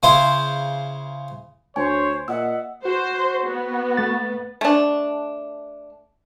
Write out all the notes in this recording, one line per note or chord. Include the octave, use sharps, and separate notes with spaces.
C#3 E4 C5
D2 C5 C#5 G#5
A#2 D#5 E5 F#5 E6
F#4 C5
B3
A3 A6
A3 D4